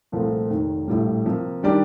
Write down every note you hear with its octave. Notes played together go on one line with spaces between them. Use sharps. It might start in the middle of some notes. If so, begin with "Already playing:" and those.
C2 A#2 F3 A3 C4
F1 D#2 D#3
A#1 A2 G3
C3 F3 A#3
D#3 G3 D4 G4 D5